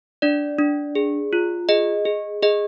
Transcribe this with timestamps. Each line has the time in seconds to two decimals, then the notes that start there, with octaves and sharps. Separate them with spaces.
0.22 D4 D5
0.59 D4
0.95 G#4
1.33 F4
1.69 G#4 D#5
2.05 G#4
2.43 G#4 D#5